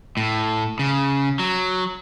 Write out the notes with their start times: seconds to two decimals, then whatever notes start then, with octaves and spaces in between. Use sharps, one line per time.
0.17 A2
0.79 C#3
1.39 F#3